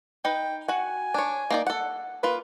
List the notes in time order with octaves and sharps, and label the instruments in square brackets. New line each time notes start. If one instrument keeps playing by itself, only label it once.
[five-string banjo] D#4 B4 [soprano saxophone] G5
[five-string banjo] F#4 F#5 [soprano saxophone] G#5
[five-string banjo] D4 C#5
A#3 D#4 D5
A4 F#5
[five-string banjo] A#3 F4 [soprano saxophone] B4